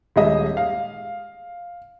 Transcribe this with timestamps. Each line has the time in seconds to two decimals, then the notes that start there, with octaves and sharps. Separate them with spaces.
0.16 D#1 G#3 D#5 E5
0.57 F5